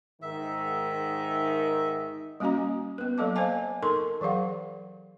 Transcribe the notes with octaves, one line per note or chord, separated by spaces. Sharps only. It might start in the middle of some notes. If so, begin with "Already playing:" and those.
G#2 D#3 E5
G3 A#3 C#4 F#4 D#5 A#5
B3 B4
F#3 A#3 A4 D#5 A5 D6
C5 D#5 F5 G#5 A5
D#4 A4 A#4 C6 C#6
E3 F#3 G#4 F5 F#5